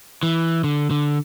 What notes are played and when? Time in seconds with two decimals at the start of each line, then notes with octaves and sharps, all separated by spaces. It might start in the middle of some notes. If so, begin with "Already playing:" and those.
0.23 E3
0.64 D3
0.91 D3